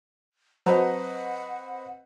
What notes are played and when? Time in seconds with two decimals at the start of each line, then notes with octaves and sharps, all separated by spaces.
0.66 F#3 C4 B4 C5 D#5 F#5 A5 A#5